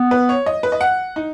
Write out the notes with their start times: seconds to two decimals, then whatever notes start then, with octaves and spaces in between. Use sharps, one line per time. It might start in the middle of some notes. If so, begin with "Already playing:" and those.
Already playing: B3
0.11 B4
0.29 C#5
0.46 D#5
0.63 B4
0.72 D#5
0.81 F#5
1.16 D#4